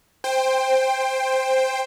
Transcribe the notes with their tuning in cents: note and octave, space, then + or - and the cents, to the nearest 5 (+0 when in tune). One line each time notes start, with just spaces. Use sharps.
C5 +0 G5 +20